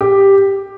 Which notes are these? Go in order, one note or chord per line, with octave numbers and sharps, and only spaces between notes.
G4